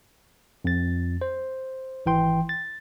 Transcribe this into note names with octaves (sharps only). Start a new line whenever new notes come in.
F2 A6
C5
G#1 E3 G5 C6
A6